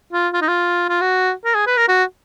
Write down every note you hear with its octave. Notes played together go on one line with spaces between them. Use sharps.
F4
F4
D#4
F4
F4
F#4
A#4
G#4
B4
A#4
F#4